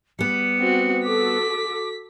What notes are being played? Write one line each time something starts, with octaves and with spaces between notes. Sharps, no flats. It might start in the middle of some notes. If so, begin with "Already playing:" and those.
G3 B3 C#7
C4 F#4
F#4 A4 D6 B6